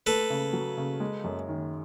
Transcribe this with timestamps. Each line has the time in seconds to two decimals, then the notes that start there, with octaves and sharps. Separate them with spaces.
0.06 A3 A4 B4
0.30 C#3
0.53 F#3
0.77 C#3
1.00 G#3
1.24 F#2
1.48 D#3